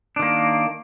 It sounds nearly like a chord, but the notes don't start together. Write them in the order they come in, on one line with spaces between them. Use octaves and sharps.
D4 D#3 A#3